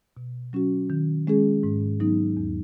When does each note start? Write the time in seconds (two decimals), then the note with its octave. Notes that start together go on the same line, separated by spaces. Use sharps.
0.17 B2
0.53 F#3 C#4 F#4
0.90 D#3
1.27 G#3 C#4 G#4
1.63 G#2
2.00 F#3 B3 D#4
2.37 E2